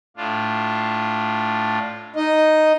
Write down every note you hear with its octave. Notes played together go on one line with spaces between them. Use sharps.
A2 D4 F4
D#4 D#5